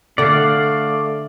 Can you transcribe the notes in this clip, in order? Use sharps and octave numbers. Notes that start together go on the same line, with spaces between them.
D3 A3 D5 F5 F#5